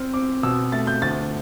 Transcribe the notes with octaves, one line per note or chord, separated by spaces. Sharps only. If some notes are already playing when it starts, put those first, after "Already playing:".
Already playing: C4 F6
C4 D6
B2 E6
A3 A6
G6
D2 A6